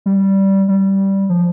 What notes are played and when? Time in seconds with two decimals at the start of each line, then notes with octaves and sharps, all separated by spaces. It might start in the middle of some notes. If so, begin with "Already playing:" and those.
0.06 G3
0.68 G3
1.29 F3